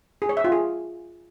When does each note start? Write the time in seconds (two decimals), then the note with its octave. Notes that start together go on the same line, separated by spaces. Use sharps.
0.22 G#4
0.29 C#5
0.37 E5
0.44 F4
0.52 G#4